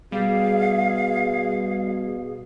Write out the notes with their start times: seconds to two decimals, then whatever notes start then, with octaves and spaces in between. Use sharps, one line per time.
0.12 B2 G3 G#4 F5